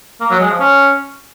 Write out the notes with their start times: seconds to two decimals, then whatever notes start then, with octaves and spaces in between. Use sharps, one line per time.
0.21 A#3
0.30 F#3
0.40 G#3
0.50 F3
0.60 C#4